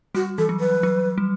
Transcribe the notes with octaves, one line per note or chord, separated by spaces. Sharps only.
G3 F#4
E3 A4
F#3
B4
F#3
G3